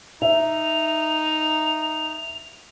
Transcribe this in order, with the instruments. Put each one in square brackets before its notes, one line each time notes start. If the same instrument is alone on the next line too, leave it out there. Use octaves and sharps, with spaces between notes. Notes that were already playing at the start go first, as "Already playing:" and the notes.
[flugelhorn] D#4 [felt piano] E5 [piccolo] F7